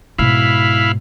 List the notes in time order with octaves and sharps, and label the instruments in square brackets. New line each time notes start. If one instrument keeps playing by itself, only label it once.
[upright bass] G#2 B2 [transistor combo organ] E4 F5 B5